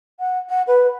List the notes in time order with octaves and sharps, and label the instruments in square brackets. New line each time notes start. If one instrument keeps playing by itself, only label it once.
[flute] F#5
F#5
B4